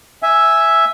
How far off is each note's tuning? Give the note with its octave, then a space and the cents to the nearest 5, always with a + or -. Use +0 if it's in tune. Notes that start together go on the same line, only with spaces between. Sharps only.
E5 +0 G#5 +0